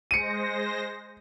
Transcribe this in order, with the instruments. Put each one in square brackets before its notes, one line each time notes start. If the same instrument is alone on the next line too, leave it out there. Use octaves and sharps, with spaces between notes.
[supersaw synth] G#3 C5 A#6 [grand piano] C#7 D#7